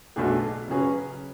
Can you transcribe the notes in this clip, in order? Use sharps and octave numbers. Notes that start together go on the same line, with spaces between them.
B1 B2 A3 D4 G#4
C#3 F#3 C#4 G#4 B4